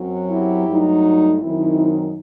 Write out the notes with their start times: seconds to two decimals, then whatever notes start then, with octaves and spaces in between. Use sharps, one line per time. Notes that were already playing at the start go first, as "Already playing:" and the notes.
Already playing: F#2 F#3 C4
0.29 E4 G4
0.66 G2 F#3 A3 D#4
1.40 F#2 D#3 F#3 C4 D#4 E4